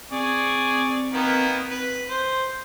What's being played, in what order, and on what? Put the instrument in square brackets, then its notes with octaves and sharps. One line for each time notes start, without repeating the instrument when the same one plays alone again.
[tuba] C4 [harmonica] G#4 D5 C#6
[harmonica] D#3 A#3 B3
B4
C5